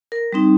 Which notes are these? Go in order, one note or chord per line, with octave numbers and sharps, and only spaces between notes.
A#4
G3 C4 D#4